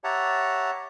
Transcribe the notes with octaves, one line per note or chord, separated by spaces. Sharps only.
G4 C#5 E5 F#5 A5 A#5